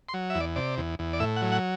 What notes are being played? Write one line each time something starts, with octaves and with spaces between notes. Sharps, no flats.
C6
F#3
E2 E5
D5
C3 D5
E2
E2
D5
A2 E5
F#5
F#3
F#5